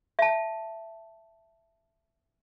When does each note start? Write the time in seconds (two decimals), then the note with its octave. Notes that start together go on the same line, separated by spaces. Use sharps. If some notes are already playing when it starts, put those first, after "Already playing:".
0.19 E5 A5